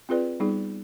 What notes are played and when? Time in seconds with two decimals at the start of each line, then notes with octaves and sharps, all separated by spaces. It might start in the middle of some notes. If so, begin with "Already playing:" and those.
0.09 C4 F4 G#4 B4 D5
0.40 G3 B3 D#4 G#4